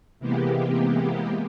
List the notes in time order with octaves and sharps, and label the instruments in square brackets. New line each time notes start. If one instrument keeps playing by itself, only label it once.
[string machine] C3 E3 G#3 A#3 B3 G4